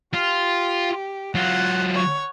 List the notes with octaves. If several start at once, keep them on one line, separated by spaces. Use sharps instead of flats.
F4 G4
F#3 F4 F#5
C#5